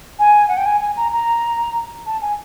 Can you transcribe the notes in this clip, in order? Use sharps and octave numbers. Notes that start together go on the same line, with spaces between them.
G#5
F#5
G5
G#5
G#5
A#5
A#5
A5
G#5